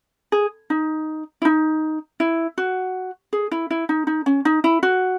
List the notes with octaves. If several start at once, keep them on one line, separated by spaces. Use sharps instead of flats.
G#4
D#4
E4
D#4
E4
F#4
G#4
E4
E4
D#4
D#4
C#4
D#4
E4
F#4